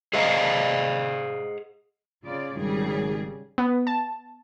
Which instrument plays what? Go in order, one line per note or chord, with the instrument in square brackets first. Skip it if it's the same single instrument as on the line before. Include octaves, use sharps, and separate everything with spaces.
[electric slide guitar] G#4 C5 D#5 F5 F#5 A#5
[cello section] C#3 F4 D5
[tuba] G#1 [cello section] C#3 G3 G#4
[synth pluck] B3
A5